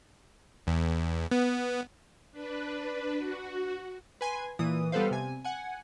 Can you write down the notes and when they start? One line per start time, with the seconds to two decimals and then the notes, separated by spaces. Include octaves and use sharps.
0.67 E2
1.31 B3
2.32 D4 B4
3.18 F#4
4.21 B4 G#5 C6
4.59 A#2 E3 D#6
4.92 G3 B3 A4 B4 C5 F5
5.11 C3 G#5
5.45 F#5 G#5